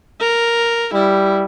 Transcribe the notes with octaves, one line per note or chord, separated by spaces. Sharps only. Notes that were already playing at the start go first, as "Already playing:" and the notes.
A#4
G3 E4